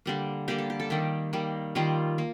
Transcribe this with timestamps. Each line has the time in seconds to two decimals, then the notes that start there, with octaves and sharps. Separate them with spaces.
0.06 D3 G3 A#3
0.48 D3 G3 A#3 G4
0.58 A4
0.70 G4
0.80 A4
0.90 D#3 G3 A#3 G4
1.33 D#3 G3 A#3
1.75 D#3 G3 A#3 F4
2.18 A#3